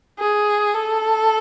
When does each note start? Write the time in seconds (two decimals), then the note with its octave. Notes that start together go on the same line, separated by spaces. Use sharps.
0.19 G#4
0.74 A4